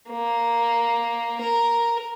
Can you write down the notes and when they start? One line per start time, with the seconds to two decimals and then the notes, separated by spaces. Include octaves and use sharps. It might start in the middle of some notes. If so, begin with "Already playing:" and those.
0.10 A#3
1.42 A#4